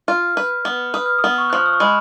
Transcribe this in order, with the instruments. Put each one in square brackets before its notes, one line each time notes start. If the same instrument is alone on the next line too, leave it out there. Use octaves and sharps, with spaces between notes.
[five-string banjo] F4 [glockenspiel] F6
[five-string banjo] B4
B3
[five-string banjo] B4 [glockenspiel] D#6
[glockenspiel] F6
D#6
[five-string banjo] B3
[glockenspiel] C#6
F#6
[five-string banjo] F3 [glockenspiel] F6
[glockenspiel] D#6
C#6
[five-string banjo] G#3 [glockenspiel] B5